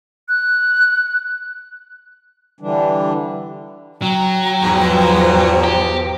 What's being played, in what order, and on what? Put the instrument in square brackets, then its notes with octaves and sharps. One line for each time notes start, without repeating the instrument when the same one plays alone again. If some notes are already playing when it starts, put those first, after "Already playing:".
[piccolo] F#6
[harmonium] D3 E3 G3 D4
[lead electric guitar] F#3 [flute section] G5 A#5
[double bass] E2 F3 [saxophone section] G#2 B2
[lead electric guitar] G4